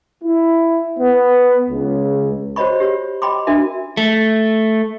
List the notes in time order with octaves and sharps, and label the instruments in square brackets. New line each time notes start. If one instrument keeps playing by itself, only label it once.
[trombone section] E4
B3
C#2
[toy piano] F#4 C5 C#5 D#5 B5 C#6
G4 C#5
D#5 G5 B5 C6 D6
D4 F#4 A#4 E5
[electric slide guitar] A3